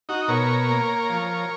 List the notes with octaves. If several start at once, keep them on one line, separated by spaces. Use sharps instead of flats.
D#4 F#4
B2 A#4 C#5
A#3
F3